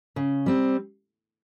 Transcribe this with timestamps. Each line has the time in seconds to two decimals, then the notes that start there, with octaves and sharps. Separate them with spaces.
0.16 C#3
0.46 G3 C4